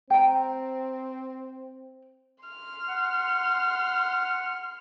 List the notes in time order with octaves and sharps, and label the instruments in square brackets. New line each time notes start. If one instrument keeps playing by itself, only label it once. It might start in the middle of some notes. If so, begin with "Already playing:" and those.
[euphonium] C4 [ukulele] G5 A#5
[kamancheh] C6 F6
[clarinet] F#5